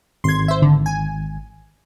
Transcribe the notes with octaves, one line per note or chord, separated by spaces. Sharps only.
G#1 C6 G#6
C5 E5
D3
G#5